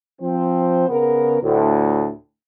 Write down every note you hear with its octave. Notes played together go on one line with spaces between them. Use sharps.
F3 C4 C5
C#3 B3 A#4
D2 A2